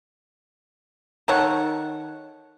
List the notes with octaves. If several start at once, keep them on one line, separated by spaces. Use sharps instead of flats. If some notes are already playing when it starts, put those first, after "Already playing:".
D#3 A4 C#5 F#5